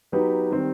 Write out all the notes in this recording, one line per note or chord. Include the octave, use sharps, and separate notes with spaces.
F#3 B3 D#4 G4 B4
D#3 G3 C4